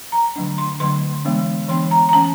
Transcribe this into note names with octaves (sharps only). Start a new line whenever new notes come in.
A#5
D3 F#3 A3 D4
C6
D3 F#3 A3 D4 C6
E3 G#3 B3 D4
E3 G#3 B3 D4 C6
A#5
A#5
E3 A3 C#4 A5